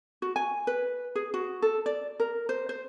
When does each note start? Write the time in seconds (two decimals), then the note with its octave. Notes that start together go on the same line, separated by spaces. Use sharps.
0.22 F#4
0.36 G#5
0.67 B4
1.15 G#4
1.34 F#4
1.62 A4
1.86 D5
2.20 A#4
2.49 C5
2.69 C5